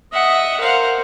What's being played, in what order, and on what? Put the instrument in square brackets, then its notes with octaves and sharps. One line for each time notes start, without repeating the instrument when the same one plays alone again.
[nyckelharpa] D#5 D#6 [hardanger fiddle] E5 F#5
[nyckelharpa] A#4 C5 [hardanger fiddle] F5 F#5